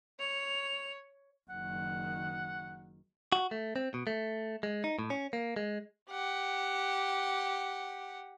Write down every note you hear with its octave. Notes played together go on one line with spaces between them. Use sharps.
C#5 F7
F#1 D#3 F#5
F#4
A3
C4
B2
A3
G#3
D#4
A2
C#4
A#3
G#3
G4 F#5